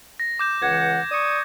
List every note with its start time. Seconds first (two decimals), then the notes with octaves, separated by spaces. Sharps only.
0.20 A#6
0.39 D6 G6 E7
0.62 C#2 E3 F#5 G#6
1.12 D5 C#6 D#6